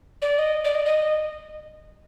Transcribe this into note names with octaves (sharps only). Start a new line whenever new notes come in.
D5
D#5
D5
D#5
D#5